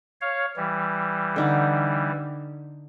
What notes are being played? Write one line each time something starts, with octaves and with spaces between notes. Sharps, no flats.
C#5 F5
E3 G3
D3 D#4 D5